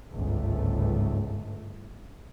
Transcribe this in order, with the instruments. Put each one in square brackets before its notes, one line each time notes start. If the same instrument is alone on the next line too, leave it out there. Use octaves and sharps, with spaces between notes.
[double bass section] G1 C#2 G#2 A3